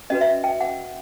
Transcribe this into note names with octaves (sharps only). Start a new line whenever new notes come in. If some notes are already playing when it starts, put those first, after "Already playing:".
C#4 F#4 B4 D#5
E5
G5
F#5